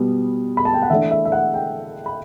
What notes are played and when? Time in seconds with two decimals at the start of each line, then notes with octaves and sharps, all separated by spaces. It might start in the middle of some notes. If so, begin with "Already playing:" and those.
Already playing: B2 G3 B3
0.57 B5
0.65 A5
0.74 G5
0.82 F#5
0.90 E3 A3 D4 E5
1.11 E5
1.25 E5
1.32 F#5
1.54 G5
2.06 B5